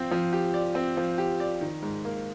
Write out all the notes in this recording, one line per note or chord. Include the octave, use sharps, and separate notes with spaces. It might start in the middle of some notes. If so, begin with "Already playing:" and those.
Already playing: F3 C4
F3
G4
D5
C4
F3
G4
D5
D#3
G#2
A#3